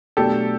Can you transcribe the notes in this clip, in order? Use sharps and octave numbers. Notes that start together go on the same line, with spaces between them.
B2 F#3 A3 D4 G4 A4